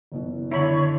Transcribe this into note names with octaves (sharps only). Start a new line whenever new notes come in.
F#1 B2 E3
D3 E4 C#5 B5